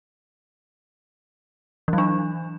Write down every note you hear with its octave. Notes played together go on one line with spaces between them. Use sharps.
E3
F#3
D4